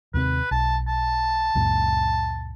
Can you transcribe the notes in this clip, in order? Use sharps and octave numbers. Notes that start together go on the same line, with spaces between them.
D#2 C3 C4 B4
B1 A5
A5
C#2 F#2 A#2